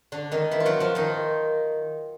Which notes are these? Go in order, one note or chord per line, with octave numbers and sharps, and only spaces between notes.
D3 D4
D#3 D#4
E3 E4
F4
F#3 F#4
F3 F4
D#3 D#4